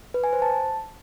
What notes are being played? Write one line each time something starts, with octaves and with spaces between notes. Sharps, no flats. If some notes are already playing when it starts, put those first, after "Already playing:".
B4
G#5
C5
A5